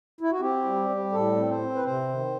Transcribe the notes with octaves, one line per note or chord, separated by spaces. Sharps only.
E4
F#4
C4 G4
G3
G3
A2 A4
C4
C5
C4
B4
C3 C5
D#3